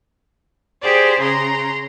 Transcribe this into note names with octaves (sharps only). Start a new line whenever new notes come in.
G4 G#4 C5 D5
C#3 A#5 C6